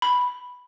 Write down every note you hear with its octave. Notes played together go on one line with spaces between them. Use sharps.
B5